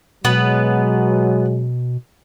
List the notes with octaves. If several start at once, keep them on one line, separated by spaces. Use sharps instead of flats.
B2 F#3 G#3 B3 B4